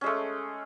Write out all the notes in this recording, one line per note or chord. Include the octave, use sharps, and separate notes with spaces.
G#3 A3 C#4